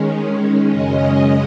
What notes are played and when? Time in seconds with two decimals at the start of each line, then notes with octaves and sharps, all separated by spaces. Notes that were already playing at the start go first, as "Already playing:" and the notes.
Already playing: D#3 G#3 C#4
0.70 F#2 C#3 G#3 C#4 D#5